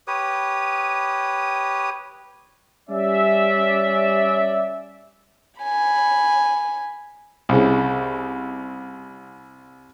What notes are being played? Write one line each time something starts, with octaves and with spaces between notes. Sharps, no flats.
G4 B4 C#5 D#6
G3 C#4 D5 E5
G#5 B5
C2 C#3